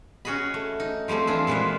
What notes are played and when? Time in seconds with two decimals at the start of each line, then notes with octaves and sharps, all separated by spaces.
0.25 C#4 F#4 G#4 D#5 B5
0.54 A3
0.80 D#4
1.08 F3 G3 A3 C4 G#4
1.27 E3 F3 D4 F4 G#4 E5
1.47 A#2 G#3 B3 C5 E5